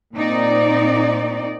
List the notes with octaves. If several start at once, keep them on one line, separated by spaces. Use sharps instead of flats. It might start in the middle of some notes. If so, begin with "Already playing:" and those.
A#2 C4 D#4 D5